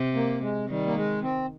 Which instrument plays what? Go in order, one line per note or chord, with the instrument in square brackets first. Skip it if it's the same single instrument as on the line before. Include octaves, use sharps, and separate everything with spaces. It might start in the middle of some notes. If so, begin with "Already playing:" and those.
Already playing: [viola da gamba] C3
[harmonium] A#3
G#3
[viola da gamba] D#3 [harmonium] G3
[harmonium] A#3
G#3
C4